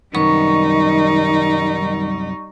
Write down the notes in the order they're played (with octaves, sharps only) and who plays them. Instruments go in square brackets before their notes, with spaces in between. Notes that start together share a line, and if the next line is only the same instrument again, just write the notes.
[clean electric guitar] C2 F#2 B3 [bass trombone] D#3 [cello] G3 D#4 [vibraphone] C#6